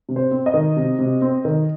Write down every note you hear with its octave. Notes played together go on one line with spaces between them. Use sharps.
C3
C5
C4
D#5
D#3
C3
C3
C4
D#3